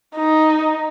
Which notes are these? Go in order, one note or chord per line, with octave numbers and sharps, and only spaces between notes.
D#4